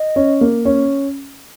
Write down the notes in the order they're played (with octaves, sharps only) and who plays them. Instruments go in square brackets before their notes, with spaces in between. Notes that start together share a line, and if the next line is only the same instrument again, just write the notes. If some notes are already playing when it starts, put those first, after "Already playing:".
Already playing: [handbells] D#5
[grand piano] C#4
A#3
C#4